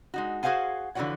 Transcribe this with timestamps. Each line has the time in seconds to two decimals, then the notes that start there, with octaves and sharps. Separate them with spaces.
0.14 G#3 D#4 F#4
0.43 F#4 G#4 C5 F5 F#5 G#5
0.95 D3 E3 F3 F#4 C#5 F#5